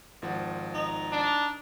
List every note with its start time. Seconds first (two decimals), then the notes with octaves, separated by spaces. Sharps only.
0.22 G#1 F3 F#5
0.75 D#4
1.12 D4